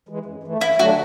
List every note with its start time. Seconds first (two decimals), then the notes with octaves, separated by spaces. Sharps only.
0.09 E3 G#3
0.26 F#2
0.44 E3 A3
0.61 F#2 E4
0.78 D3 F#3 A3 D4 F#4